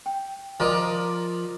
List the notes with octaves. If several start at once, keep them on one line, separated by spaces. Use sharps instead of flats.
G5
F3 A#4 D5 D#5 D6